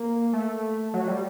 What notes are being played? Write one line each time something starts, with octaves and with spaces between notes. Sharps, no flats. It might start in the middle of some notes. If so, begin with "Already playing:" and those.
Already playing: A#3
A3
F#3
G3